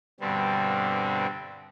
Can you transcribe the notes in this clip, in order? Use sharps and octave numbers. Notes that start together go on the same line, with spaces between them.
G2 B2 D3 G3 C4